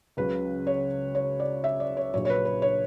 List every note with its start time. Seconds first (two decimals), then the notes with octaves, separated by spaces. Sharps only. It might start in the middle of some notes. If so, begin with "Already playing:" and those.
0.17 C#2 C#3 F#3 B4
0.67 C#5
1.15 C#5
1.40 D5
1.64 E5
1.80 D5
1.97 C#5
2.14 A#1 A#2 F#3 C#5
2.25 C#5
2.30 B4
2.45 B4
2.62 C#5